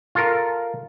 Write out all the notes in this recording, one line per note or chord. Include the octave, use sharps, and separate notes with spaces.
F4 A4 A#4